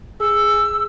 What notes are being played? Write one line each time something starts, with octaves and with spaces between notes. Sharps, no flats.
G#4 E6